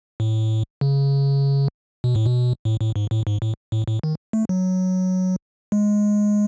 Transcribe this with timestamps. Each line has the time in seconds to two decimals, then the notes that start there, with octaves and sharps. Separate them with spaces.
0.20 A2
0.81 C#3
2.04 B2
2.15 A2
2.26 B2
2.65 A2
2.81 A2
2.96 G#2
3.11 A2
3.27 G#2
3.42 A2
3.72 A2
3.88 A2
4.03 D#3
4.33 A3
4.49 F#3
5.72 G#3